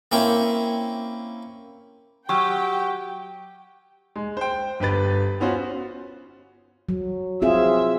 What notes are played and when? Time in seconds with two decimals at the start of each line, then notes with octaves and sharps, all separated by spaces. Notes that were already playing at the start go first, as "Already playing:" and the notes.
0.12 A#3 C4 C#4 E4 E5 G5
2.29 F#3 G4 G5 C#6
4.16 G#3
4.37 C5 G5
4.80 G1 G4 B4 A6
5.40 B3 C#4 F4 F#4 C5
6.89 F#3
7.42 C4 F4 G#4 E5